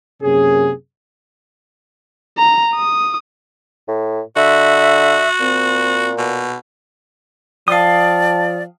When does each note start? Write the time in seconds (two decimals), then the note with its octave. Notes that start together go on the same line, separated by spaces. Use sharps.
0.22 F#2 C3 A#3 C#4 G#4
2.38 A#5
2.75 D#6
3.88 A2
4.36 D3 F#4 E5
5.40 A#2 C4
6.18 B2
7.68 F3 D5 F5 G5 A5 D#6